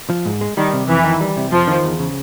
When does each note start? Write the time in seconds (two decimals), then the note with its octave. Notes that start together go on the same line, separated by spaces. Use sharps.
0.10 F3
0.26 G#2
0.41 G#3
0.57 D#3 G3
0.73 C3
0.89 F2 E3
1.04 D#3
1.21 G3
1.37 C3
1.52 F2 F3
1.68 D#3
1.84 E2
1.99 C#3